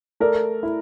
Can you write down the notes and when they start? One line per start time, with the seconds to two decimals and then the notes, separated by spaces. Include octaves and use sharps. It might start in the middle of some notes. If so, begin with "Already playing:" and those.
0.20 A3 A#4 D5
0.63 E4